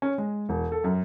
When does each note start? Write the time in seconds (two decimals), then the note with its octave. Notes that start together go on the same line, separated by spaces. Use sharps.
0.02 C#4
0.18 G#3
0.49 E1
0.72 A4
0.84 F#2